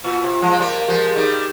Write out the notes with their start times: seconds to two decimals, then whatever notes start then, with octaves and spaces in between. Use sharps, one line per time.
0.04 A#2 F4
0.24 C3
0.42 F3 G#3
0.51 C4
0.60 G3 A#3 G4 A#4
0.88 F3 G#3 G4 A#4
1.09 G#4
1.16 D#3 G3 D#4 G4